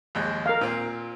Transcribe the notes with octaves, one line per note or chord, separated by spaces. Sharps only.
A#1 D#2 G#3
A#4 F5
A#2 C4